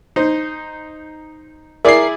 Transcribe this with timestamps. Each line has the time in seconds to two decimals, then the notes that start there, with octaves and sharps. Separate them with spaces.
0.16 D#4 C5
1.85 E4 G#4 A#4 D5 C7